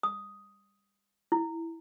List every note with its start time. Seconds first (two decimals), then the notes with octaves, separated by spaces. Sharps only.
0.03 D#6
1.32 E4